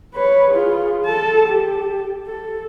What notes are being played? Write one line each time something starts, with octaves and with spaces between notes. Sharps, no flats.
B4 C#5
F4 G#4
A4 A5
G4
A4